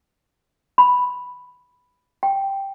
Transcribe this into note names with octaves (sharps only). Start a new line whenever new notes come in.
B5
G5